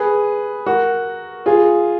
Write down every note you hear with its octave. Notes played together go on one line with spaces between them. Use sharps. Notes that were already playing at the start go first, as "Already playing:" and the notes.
Already playing: G#4 B4
F#4 A#4
F4 G#4